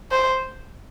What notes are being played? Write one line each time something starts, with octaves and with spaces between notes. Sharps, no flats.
C5